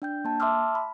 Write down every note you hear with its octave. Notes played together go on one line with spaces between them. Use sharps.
D4 G5 G6
A#3 A5
E5 A5 C6 D6 E6 F6
B5